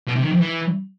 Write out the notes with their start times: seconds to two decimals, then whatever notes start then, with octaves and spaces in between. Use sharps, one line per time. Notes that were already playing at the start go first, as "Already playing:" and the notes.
0.07 B2
0.15 C3
0.23 D#3
0.31 F2
0.39 E3